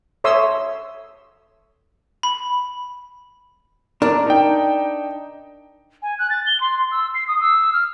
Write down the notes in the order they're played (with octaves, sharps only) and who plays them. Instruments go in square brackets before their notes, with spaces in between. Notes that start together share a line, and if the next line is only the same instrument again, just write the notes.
[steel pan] A4 C#5 E5 C6 D#6 E6
[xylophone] B5
[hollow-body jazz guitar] D4 A#4
[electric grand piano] D#4 G5
[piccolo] G#5
F#6
A6
G7
C6
E6
C7
D#6
E6
F6